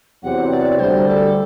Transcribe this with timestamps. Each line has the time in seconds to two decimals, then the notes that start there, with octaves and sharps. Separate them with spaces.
0.23 E2 C3 F#3 C4 G4 F#5
0.51 D5
0.79 D2 D3 G3 C5
1.08 A4